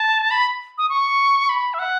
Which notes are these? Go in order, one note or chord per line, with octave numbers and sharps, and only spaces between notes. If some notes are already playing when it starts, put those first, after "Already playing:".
Already playing: A5
B5
D#6
C#6
B5
E5
F#5